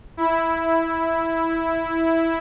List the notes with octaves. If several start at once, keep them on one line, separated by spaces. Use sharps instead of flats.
E4